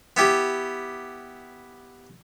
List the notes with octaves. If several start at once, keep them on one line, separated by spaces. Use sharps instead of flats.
B3 E4 G4